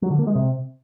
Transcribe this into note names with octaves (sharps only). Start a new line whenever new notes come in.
F#3
D3
A#3
G#3
C3